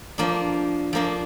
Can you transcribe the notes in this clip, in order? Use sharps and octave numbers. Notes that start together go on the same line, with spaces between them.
F3 A#3 D4
F3 A#3 D4